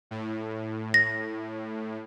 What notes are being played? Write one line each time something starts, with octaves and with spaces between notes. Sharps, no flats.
A2
A#6